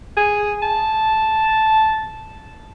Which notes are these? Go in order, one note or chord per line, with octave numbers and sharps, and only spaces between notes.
G#4
A5